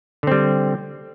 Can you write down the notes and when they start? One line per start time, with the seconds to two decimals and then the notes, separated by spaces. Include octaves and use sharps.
0.23 D3
0.27 C4
0.32 G3